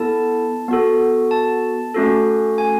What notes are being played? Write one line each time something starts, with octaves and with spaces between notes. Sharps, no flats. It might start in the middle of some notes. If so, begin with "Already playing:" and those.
Already playing: B3 E4 A4 A5
B3 F#4 A4
A5
A3 C#4 F#4 A4
G#5